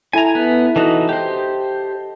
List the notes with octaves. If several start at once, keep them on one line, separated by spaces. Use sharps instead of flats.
E4 A4 G#5 A#5
B3
E3 D#4 F#4 A4 D#5 A5
G4 C5 G5